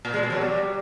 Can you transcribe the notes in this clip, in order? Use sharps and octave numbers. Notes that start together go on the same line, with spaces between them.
A#2
G#3
B2
F#3
G3